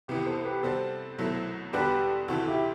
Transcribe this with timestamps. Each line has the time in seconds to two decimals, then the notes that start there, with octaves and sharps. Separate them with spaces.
0.08 C2 C3 E3 B3 G4 B4
0.26 A4 C5
0.45 G4 B4
0.63 C3 G3 C4 F#4 A4 C5
1.18 C2 B2 F#3 A3 E4
1.73 E2 D3 G3 D4 F#4 G4 B4
2.28 D2 C3 E3 F#4 A4
2.47 E4 G4